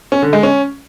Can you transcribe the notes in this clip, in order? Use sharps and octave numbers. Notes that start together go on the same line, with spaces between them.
C#4
D3
G#3
C#4